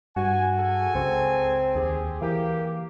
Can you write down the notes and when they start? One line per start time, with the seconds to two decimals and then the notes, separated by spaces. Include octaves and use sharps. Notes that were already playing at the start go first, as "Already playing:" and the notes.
0.16 G2 F#4 G#5
0.58 G#4 A4 G#5
0.95 C#2 C4
1.75 D#2 G4 G#4
2.22 E3 A#3 G4